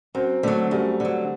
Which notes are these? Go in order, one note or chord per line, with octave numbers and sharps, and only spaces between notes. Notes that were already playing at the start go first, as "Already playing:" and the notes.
F#2 C4
D3 F#3 A3
F#2 G3
D3 F#3